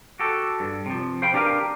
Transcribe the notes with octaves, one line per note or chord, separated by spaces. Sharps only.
F#4 G4 A4
G2
C3 F3
C5 F5 G5 B5 C6
D4 G4 A#4 B4 F5